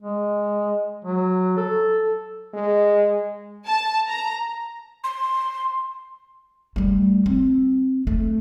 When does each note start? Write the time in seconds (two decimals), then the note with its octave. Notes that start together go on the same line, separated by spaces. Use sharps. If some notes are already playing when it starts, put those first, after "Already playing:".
0.02 G#3
1.05 F#3
1.57 A4
2.53 G#3
3.66 A5
4.08 A#5
5.04 C6
6.76 G3 A3
7.26 C4
8.07 A3